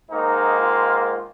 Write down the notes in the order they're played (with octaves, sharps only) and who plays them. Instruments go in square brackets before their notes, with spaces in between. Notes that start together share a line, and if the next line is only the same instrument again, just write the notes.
[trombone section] G#2 D#3 A#3 D#4
F4